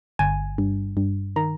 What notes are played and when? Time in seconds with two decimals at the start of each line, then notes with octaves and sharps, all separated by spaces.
0.19 G1 G#5
0.58 G2
0.97 G2
1.36 D#3 A#5